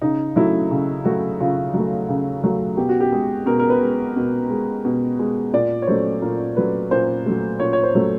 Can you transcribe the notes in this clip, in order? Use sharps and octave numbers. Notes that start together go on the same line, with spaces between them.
C#3 D#4
F#3 A3 E4
C#3
F#3 A3 F#4
C#3 F4
F#3 A3
C#3
F#3 A3
B2 G4
F#4
G4
G#3 G#4
B2 A#4
A#4
B4
G#3
B2
G#3
B2
G#3
A#2 D5
C#5
F#3 A3 C5
A#2 A#4
F#3 A3 B4
A#2 C5
F#3 A3
A#2 C#5
C#5
C5
F#3 A3